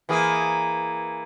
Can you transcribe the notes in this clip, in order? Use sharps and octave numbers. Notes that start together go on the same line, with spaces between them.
E3 A#3 G#4